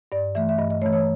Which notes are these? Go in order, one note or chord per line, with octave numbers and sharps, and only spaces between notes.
G2 D5
E3 A3 E5
E5
G2 D#5
D#5
E3 A3 C#5
C#5